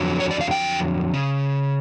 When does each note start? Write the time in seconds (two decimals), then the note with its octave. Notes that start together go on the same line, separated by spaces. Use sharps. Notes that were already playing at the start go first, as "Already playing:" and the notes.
Already playing: F2 D3 F#3
0.20 C#5
0.31 D5
0.41 F5
0.51 G5
1.14 C#3